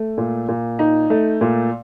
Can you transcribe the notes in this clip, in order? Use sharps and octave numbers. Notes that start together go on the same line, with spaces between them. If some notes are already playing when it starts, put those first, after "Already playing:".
Already playing: A3
A#2
A#2
D#4
A3
A#2